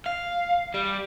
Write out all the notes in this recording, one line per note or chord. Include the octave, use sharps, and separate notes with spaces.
F5
G3